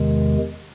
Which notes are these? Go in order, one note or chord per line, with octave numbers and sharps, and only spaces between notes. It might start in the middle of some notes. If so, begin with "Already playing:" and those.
Already playing: E2 C3 D#3 G#3